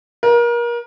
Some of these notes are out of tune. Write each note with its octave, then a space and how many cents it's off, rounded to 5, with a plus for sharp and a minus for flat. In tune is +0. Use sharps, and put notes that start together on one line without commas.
A#4 +30